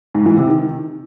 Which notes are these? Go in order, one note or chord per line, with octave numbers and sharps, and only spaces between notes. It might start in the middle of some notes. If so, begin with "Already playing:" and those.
G#2
E3
C3
D#3